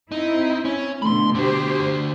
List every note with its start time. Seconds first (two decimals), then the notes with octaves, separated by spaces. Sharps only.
0.12 C4 D#4 E4
0.65 C#4
1.02 B2 D3 A3 B5 C6
1.35 D3 F#4 G4 C5